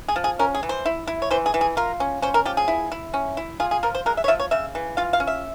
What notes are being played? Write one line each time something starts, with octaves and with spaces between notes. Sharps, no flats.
G#4
F3
G#4
C#4 A#4
G#4
E3
C5
E4
E4
C#5
E3 C5
G#4
E3
G#4
F4 A#4
C#4
C#4 C5
A#4
F3 G4
G#4
E4
E4
C#4
E4
F4 G#4
G#4
F3 A#4
C5
G#3 A#4
E5
C#5
F3 E5
C#5
C#3 E5
E3
F4 F5
F5
C#4
E5